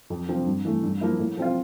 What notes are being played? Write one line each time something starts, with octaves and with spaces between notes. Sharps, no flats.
F2
D3 F3 C4
G2
E3 A3
G2
F3 A#3 E4
A2
F3 C4 F4